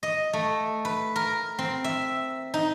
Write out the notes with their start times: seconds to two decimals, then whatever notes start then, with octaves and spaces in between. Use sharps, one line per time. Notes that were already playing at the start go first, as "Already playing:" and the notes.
0.03 D#5
0.33 A3
0.85 B4
1.16 A#4
1.59 C4
1.84 E5
2.54 D#4